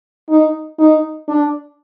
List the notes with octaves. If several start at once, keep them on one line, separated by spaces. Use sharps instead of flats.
D#4
D#4
D4